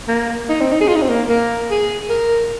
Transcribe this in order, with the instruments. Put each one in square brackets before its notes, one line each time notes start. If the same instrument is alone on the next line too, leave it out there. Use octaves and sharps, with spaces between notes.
[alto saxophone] A#3
D#4
C4
D#4
G#4
F4
D#4
C4
A#3
A#3
G#4
A#4